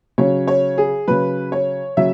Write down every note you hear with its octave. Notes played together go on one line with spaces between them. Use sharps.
C#3 F#3 C#5
C#5
G#4
C#3 F#3 B4
C#5
C#3 F#3 E5